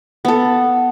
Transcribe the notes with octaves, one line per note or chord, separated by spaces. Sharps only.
B3 A4